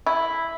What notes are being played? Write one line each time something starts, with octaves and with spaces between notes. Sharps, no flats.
E4